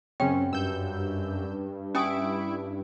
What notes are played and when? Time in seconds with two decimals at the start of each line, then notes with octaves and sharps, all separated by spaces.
0.20 F#2 C#3 C4 C#4 G5
0.53 G2 E6 G6
1.95 C#4 E4 G#5 C#6 D#6 D7